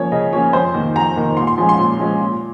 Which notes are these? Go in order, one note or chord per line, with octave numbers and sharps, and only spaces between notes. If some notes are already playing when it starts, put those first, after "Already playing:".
Already playing: F3 A#3 C#4 C#5
C#3 D#5
F3 A#3 C#4 C#5
F2 C5
D#3 A#3
F2 A#5
D#3 A#3
A#2 C6
C6
F3 G#3 C#4
C6
A#2
F3 G#3 C#4
A#2